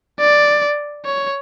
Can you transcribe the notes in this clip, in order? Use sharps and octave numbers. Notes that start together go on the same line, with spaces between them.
D5
C#5